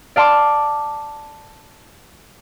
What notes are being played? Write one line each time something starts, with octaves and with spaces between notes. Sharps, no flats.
D5 F5 A5 C6 D6